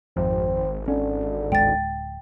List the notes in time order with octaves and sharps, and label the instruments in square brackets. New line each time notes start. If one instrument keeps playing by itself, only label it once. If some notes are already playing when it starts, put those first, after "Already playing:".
[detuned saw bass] G#1 [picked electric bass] F2 [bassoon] C4
[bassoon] D3 [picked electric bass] C#4
[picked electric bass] D1 G#3 [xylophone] G5 A6